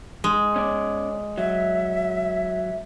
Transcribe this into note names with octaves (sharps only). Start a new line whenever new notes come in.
G#3
C#4 D5
F#3 E5